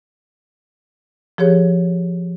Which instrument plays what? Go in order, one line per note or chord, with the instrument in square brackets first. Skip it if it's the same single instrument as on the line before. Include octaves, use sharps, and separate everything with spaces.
[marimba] F3 G4 G#4 C#5